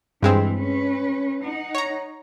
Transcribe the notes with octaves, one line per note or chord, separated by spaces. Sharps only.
G2 E3 G#3 C4
C#4 B4
D#4 F#5
C#5 A#5